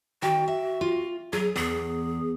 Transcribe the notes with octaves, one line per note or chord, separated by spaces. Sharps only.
D#3 F#4 G5
E5
F4
F#3 G#4
E2 G#4